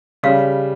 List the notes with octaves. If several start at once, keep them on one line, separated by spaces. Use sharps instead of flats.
C#3 G3 F5